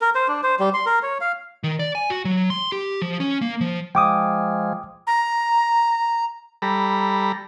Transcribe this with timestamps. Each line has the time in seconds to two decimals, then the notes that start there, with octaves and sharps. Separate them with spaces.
0.01 A#4
0.15 C5
0.28 D4
0.43 C5
0.60 G3
0.74 C6
0.86 A#4
1.03 C#5
1.21 F5
1.64 D#3
1.79 D5
1.95 G#5
2.10 F#4
2.25 F#3
2.50 C6
2.72 G4
3.01 F3
3.20 C#4
3.41 A#3
3.61 F3
3.95 F3 G#3 G5 D6 D#6
5.07 A#5
6.62 G3 A4 A#5 B5